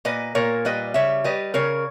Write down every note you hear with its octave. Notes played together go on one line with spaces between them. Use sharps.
A#2 B4 D#5
A#2 A#4 C#5
G3 B4 D#5
C#3 C#5 E5
G3 B4 D#5
C#3 A#4 C#5